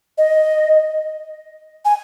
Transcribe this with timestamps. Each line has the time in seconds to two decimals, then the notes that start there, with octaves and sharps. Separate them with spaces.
0.18 D#5
1.85 G#5